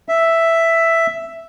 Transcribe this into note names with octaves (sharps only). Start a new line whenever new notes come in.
E5